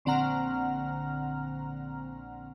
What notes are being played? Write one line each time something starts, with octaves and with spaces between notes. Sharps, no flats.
A#1 D3 C4 F#5 A#5 F6